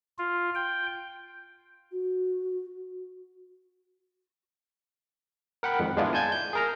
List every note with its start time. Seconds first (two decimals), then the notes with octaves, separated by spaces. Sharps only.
0.18 F4
0.55 G5
1.91 F#4
5.63 A#4 F#5 G5 B5
5.79 F2 G#2 D#3
5.97 G#3 B3 D4 E4 F4
6.13 G#5 A5 G6 G#6
6.32 G6
6.53 G#4 A#4 A#5